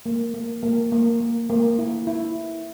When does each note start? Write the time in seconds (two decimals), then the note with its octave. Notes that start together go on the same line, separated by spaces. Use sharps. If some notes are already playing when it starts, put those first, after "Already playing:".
0.06 A#3
0.34 A#3
0.63 A#3
0.92 A#3
1.21 A#3
1.50 A#3
1.78 E4
2.07 E4